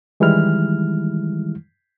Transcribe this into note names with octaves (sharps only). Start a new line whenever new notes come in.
D#3 E3 G3 G#3 E4 F6